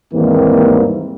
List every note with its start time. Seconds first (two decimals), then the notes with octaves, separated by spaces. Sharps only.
0.13 D#2 G#2 E3 G3 A#3 C4